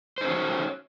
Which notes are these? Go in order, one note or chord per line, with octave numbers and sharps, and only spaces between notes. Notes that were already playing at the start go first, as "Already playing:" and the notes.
C#4 D#4 F#4 C5 C#5